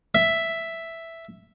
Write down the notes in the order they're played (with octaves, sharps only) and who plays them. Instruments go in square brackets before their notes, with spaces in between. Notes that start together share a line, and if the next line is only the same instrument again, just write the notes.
[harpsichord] E5